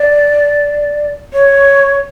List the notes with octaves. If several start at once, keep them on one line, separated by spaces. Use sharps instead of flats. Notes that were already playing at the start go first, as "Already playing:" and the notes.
Already playing: D5
C#5